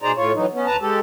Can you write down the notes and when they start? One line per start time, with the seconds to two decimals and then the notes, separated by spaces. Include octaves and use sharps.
0.02 B2 D#4 G#4 C5 D5 A#5
0.16 A2 F4 C#5
0.34 E3 F#3 D#4
0.53 B3 C#4
0.67 D2 B4 A5 A#5
0.81 G#3 G4 A4